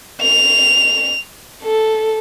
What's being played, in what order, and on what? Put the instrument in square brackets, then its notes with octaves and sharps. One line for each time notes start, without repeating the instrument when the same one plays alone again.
[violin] F7
A4